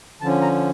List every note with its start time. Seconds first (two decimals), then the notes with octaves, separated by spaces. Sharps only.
0.21 D3 F3 C#4 A5
0.42 A#5